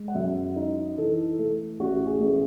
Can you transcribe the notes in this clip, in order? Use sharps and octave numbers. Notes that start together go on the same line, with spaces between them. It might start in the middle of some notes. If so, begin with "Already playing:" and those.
Already playing: G#3
F#5
F#2 E5
D#4
E3 A4
A3
A1 F#4
G#4
A1